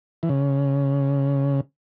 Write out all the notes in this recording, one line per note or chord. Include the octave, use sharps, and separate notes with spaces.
E3
C#3